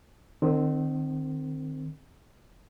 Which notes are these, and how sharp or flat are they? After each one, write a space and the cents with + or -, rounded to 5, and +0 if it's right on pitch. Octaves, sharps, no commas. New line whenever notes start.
D#3 -35 C4 +0